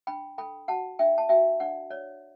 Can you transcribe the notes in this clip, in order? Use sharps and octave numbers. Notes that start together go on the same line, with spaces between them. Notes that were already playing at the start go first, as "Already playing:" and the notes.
D4 G5 B5
A4 G5 B5
F#4 F#5 A5
D4 E5 G5
A5
F#4 E5 G5
D4 D5 F#5
C#5 D5